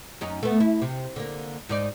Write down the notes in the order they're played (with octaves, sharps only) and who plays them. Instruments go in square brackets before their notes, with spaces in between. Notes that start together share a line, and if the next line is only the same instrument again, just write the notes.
[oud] F#2 C#4 D#4
A3 B3
E4
C3
D3 A#3
G#2 D#4 D5